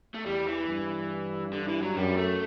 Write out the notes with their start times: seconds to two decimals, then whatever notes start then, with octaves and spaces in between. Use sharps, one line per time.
0.14 A3
0.25 E2 G3
0.47 E3
0.68 G2
1.53 D3
1.68 E3
1.82 F#3
1.96 F#2 G3
2.17 A3